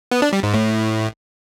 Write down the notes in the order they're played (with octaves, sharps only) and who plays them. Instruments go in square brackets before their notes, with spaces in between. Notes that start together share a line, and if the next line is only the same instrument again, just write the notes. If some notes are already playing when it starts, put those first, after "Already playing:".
[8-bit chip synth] B3
D4
G3
G#2
A2